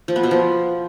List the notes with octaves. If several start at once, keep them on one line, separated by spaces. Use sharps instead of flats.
F3
B3
B2
F3